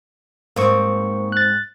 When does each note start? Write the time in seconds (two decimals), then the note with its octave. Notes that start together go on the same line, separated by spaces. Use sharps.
0.56 G#2 A#3 C4 C#6
1.32 F#6 A6